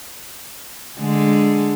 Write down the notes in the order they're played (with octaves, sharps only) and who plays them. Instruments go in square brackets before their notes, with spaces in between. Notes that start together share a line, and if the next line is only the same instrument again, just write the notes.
[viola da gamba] D3 G#3